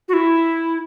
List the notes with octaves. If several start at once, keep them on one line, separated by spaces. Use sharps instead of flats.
F#4
E4